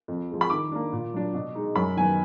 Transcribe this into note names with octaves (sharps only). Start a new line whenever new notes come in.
F2
F3 G#3
B5
D#3 D6
A#3 D4
A#2
F#3 D4
B2
G#3 D#4
F#2 B5
D#3 F#3 B3 G#5